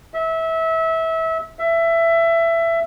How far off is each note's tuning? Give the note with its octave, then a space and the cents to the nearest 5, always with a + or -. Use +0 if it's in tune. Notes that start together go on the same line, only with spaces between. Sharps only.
E5 -25
E5 +20